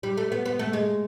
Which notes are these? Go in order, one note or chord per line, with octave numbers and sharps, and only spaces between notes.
G3
A3
B3
B3
A3
G#3